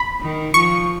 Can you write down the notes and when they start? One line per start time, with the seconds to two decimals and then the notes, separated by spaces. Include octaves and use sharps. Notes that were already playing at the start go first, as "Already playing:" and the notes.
Already playing: B5
0.21 D#3
0.54 F3 C#6